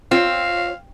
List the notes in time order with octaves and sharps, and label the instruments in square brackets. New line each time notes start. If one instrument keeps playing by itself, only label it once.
[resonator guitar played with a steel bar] C4 [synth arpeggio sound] F4 C#5 [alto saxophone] F5